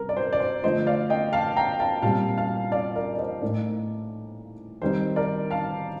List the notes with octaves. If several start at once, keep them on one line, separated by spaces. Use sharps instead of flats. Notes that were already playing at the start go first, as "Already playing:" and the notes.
Already playing: C3 G3 A#4
D5
C5
D5
C5
D3 F3 A3 C5 D#5
D5 F5
D#5 G5
F5 A5
G5 A#5
F5 A5
A#2 G3 C4 F5 A5
F5 A5
D5 F5
A#4 D5
D5
C5 D#5
A2 A3 D#4 A#4 D5
D#3 G3 C4 D#4 C5
A#4 D5
F5 A5